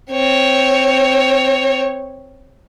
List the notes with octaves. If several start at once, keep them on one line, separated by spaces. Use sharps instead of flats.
C4 C#5